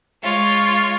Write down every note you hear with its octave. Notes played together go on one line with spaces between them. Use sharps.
G#3 F4 C#5